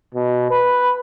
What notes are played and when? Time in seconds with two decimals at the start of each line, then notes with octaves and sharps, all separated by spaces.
0.14 B2
0.51 B4